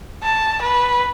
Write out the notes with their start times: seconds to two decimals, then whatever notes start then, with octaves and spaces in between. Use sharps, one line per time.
0.23 A5
0.62 B4